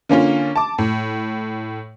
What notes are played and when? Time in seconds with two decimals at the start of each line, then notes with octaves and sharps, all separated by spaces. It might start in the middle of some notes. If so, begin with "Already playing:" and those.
0.09 D3 A#3 C#4 F4
0.56 A5 D6
0.78 A2